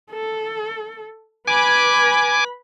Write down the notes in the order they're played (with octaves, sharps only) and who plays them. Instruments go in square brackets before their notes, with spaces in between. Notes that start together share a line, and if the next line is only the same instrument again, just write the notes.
[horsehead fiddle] A4
[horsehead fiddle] B4 B5 [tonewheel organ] G#5 D6